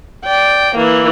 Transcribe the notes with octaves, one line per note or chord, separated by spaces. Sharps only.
D5 G5
E3 A#3